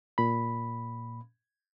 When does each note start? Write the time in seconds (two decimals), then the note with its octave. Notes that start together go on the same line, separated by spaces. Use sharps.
0.18 A#2 B5